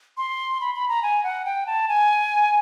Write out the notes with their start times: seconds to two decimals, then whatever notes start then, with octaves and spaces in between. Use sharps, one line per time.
0.17 C6
0.61 B5
0.75 B5
0.89 A#5
1.03 G#5
1.24 F#5
1.45 G5
1.67 A5
1.88 G#5